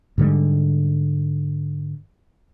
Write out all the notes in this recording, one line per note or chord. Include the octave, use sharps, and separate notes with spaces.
G#2 D3 G3